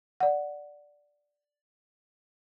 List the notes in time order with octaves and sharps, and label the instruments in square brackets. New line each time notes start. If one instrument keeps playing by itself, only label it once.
[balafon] D5 F#5